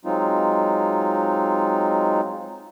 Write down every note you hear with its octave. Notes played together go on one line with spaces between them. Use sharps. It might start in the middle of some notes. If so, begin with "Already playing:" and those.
F#3 G#3 C4 D#4 F4